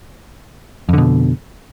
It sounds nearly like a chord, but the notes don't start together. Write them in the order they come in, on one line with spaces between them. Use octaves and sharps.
F2 D3 B2